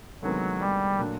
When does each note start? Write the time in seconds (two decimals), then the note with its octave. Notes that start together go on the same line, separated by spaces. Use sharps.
0.22 D2 C3 D#3 F#3 G#3 B3
0.60 G3
0.99 A#2 F#3 A3 D4